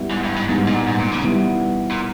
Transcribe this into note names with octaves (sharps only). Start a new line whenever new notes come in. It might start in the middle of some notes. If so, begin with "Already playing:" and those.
Already playing: G3 B3 E4
G#2
G2
G#2
G#2 G3 B3 D#4
A#2
G#2
A#2
C#3
G3 B3 E4
A#2